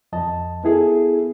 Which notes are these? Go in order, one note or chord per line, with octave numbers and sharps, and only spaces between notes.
F2 D#5 A5
B3 E4 G#4 A4